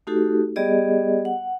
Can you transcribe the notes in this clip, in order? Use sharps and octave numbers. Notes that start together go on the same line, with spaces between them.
A3 D#4 F#4 G4 A4
G3 B3 G4 G#4 D5 D#5
F#5